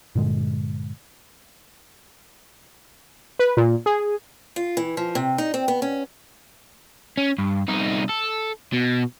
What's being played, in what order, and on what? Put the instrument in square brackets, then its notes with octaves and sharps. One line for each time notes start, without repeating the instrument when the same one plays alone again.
[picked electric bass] G2 A#2 D3 G#3
[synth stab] B4
A#2
G#4
[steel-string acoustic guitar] F4
E3
F3
C3
D#4
C4
B3
C#4
[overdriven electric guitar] C#4
G2
C2 D#4
A4
B2